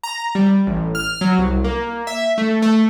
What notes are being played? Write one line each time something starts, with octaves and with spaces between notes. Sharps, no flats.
A#5
G3
A1
F6
F#3
C2
A#3
E5
A3
A3